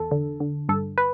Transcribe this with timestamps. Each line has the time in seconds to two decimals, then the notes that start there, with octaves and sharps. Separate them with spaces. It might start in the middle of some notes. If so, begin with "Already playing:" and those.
Already playing: E2 A4
0.11 D3
0.40 D3
0.69 G2 A4
0.98 B4